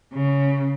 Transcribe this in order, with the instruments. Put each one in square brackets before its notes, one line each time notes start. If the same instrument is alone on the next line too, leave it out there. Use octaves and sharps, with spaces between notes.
[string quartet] C#3